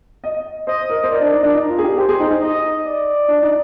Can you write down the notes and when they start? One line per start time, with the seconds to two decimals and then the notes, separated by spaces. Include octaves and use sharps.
0.24 D#5
0.67 C5 D#5
0.90 A#4
1.04 C5
1.10 A#4 D5
1.21 D4
1.32 D#4
1.43 D4
1.54 D#4 A#4
1.69 F4
1.79 G#4
1.83 G4
1.98 G4 C5
2.09 G#4
2.20 D#4
2.31 D#4
2.41 D#5
2.85 D5
3.28 D4
3.43 D#4